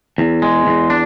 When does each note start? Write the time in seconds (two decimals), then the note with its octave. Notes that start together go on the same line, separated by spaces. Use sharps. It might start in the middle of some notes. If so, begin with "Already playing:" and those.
0.18 E2
0.42 G#3
0.67 E2
0.90 D4